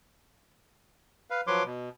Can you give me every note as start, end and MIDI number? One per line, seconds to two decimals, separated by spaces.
1.30 1.41 71
1.30 1.41 77
1.47 1.63 53
1.47 1.63 54
1.47 1.63 71
1.47 1.63 73
1.47 1.63 84
1.47 1.63 86
1.65 1.89 47